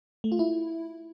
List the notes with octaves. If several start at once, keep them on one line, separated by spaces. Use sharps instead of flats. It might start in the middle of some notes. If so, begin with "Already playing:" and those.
A3
F4
E4